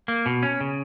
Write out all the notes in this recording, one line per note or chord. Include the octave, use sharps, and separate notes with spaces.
A#3
B2
C#4
C#3